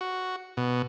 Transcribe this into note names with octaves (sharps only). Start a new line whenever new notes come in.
F#4
B2